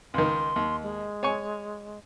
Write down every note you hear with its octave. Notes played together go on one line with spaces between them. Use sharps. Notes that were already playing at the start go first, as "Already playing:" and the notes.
C#2 D#3 C6
D#2
G#3
C#5 G#5 C#6